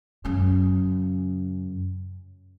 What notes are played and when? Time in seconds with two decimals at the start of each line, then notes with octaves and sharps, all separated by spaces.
0.25 F#2 C#3